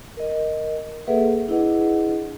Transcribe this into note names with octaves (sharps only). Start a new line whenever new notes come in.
A#4 D#5
A#3 G#4 A4 B4 E5 F#5
D4 E4 G#4 B4 D#5 F#5